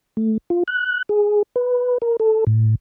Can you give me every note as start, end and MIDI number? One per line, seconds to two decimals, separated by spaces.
0.17 0.38 57
0.50 0.63 65
0.68 1.02 90
1.09 1.43 68
1.56 1.98 71
2.02 2.17 70
2.20 2.44 69
2.47 2.75 45